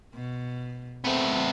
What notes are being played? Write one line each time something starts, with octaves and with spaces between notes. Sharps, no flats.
B2
A3 B3 C4